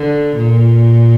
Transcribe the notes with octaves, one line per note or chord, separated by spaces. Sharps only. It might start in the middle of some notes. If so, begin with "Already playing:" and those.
Already playing: D3
A#2